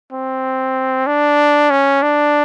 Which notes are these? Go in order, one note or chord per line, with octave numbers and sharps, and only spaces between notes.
C4
D4
C#4
D4